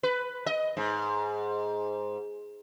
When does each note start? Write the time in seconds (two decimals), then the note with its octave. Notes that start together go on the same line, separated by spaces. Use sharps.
0.03 B4
0.46 D#5
0.77 G#2